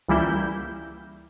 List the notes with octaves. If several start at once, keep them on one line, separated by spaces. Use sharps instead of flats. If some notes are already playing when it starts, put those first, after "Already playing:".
C#2 E3 G3 A#3 E4 G6